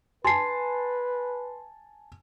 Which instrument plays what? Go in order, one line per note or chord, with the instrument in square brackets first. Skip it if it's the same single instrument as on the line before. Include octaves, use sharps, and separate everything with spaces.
[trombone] B4 [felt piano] G#5 A5 [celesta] C6 C7